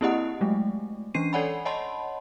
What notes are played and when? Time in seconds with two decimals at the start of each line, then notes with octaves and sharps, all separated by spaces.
0.01 A#3 C4 E4 G4 D#5 F#5
0.41 F#3 G#3 A3
1.14 E3 C#4 D4 C7 D#7
1.33 A4 C#5 D5 F#5 G#5 B5
1.65 C#5 D#5 F#5 A5 B5 C6